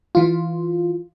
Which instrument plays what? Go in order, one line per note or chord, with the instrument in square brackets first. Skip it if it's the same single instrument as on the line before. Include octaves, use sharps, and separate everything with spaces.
[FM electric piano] E3 F4